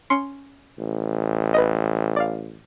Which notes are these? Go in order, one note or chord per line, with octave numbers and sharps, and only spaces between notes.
C#4 C6 C#7
A1
B4 D#5
D5 F5